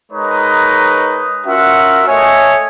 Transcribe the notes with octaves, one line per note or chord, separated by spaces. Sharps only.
G#3 D#4 A#4 B4 C#5 D#5
C#4 F4 F#4 A#4 E5 F#5
A3 C#5 D#5 E5 G#5